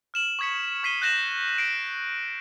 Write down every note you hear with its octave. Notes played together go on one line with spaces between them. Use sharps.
F6 E7 F#7
C#6 D#6 G#6 B6 C#7
C#6 G#6 B6 C7 D#7 G7
F#6 G6 A#6 E7 F#7
B6 C7 D7